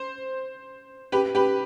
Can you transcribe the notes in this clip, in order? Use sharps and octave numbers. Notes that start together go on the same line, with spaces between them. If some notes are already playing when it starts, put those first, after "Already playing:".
Already playing: C5
G4 B4
G4 B4